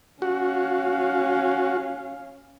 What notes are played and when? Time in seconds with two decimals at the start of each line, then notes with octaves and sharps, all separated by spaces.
0.22 C#4 F#4 F5